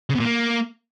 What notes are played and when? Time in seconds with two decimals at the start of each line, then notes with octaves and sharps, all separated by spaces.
0.10 C#3
0.15 B2
0.20 A#2
0.25 A#3